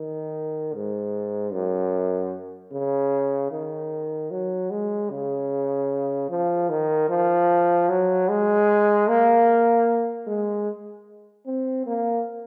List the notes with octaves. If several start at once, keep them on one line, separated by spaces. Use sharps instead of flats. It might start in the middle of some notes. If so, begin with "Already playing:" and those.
Already playing: D#3
G#2
F#2
C#3
D#3
F#3
G#3
C#3
F3
D#3
F3
F#3
G#3
A#3
G#3
C4
A#3